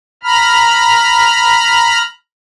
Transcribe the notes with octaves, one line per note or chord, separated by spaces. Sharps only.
A#5 B5 F6